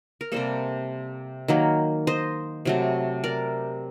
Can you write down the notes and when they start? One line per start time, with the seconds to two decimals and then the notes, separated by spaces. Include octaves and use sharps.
0.21 A#4
0.32 C3 G3 A#3 A4 C5
1.48 D#3 F#3 A#3
2.07 C5 D#5
2.65 C3 F#3 A3
3.24 A#4 D5